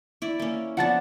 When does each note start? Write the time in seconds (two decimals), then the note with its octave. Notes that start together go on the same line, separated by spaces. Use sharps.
0.22 E4 D5
0.40 A#3 C#4
0.77 F3 B3 D4 F#5 A5 A6